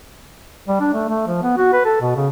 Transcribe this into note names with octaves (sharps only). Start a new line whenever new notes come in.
G3
D4
A3
A3
F3
B3
F#4
B4
A4
B2
C#3